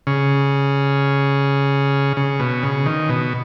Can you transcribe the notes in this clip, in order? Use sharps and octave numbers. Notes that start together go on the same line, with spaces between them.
C#3
C#3
B2
C#3
D#3
B2